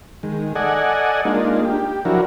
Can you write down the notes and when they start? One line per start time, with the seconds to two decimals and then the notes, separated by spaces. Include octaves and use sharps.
0.23 D#3 G#3
0.55 A4 D5 D#5 F#5 G#5
1.25 G#3 A#3 D4 D#4 F4
1.65 G4
2.05 F3 F#3 D4 E4 F#4 A#4